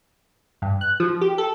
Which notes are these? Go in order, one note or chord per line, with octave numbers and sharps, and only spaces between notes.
G2
F#6
F3
G4
A4